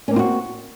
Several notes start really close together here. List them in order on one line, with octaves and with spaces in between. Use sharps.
C#4 A#3 C4 F4 F#4